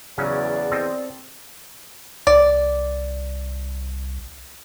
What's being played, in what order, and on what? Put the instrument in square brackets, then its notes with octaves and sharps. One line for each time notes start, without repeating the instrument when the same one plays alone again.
[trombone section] E2 [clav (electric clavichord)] C#3 F#3 C#4 [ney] D5
[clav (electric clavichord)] C4 A4 D#5
[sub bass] C2 [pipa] D5